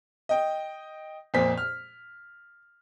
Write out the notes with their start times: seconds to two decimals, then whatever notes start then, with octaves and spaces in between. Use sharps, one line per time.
0.29 D#5 G5
1.34 F2 A#2 C4 B6
1.58 F6